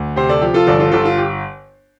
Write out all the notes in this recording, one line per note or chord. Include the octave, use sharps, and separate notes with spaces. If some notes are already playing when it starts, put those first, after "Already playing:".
Already playing: D2
C3 G4 C5
A4 D5
F3 G4
F4 A4
G1 A4 D5
F4 A4
G1 F4 A4
F4
G4